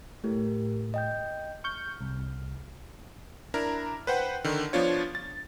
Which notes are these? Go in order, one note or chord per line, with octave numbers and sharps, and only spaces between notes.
A2 G4 A#4
D#5 G5 G6
C#6 F6 G6
C2
D4 E4 A#4 A#5
B4 C5 F#5 G5
D3 D#3
F3 B3 D4 F4 C#5
A6